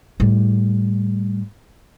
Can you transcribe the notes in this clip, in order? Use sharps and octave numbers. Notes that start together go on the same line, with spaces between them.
A2 G3